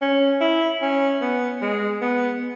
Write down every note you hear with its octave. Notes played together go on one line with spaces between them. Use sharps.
C#4
E4
C#4
B3
G#3
B3